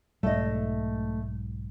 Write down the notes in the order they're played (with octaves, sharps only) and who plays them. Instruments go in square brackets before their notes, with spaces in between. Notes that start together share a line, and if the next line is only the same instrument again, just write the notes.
[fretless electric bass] B1 G#2 [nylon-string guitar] A3 D#5